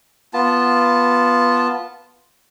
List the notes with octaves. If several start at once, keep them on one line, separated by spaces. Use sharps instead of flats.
B3 F4 A5